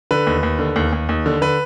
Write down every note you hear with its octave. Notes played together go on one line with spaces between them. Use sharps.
D3 B4
D#2
D#2
D3
D#2
D#2
D#2
D3
D3 B4